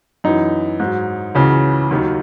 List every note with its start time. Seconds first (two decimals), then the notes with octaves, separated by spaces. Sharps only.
0.24 F#2 E3 D#4
0.80 G#2 F#3
1.35 C#2 C#3 E3 F#4
1.91 D#2 D#3 F#3